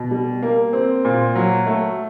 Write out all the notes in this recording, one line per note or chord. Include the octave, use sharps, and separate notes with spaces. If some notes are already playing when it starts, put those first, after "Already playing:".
Already playing: B2
G3
A#3
C4
A#2
F#3
A3